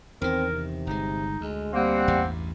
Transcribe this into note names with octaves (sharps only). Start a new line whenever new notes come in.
E2 D#3 C4 A#4
C3
G1 G#3 D#4
D2 G#3
G3 A#3 C4 F#5
A1 E2 G2